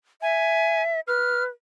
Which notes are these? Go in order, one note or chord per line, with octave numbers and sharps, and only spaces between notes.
E5 G#5
B4 F6